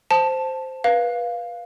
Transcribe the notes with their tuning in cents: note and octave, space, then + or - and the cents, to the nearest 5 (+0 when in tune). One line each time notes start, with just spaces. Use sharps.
C5 +0 A5 +0
B4 -25 F5 +0